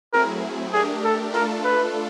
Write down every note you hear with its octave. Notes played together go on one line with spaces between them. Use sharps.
F#3 A3 C4 E4 G#4 A#4
A3 D4 G4 G#4 A#4
A4
A3 D4 F4 A4 A#4
B4